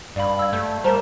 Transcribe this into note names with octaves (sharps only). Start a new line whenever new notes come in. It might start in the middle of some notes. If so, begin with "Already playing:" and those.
G2 D5 F5 B5
E6 G#6
A3 G6
G3 A#4 C5 A5 A#5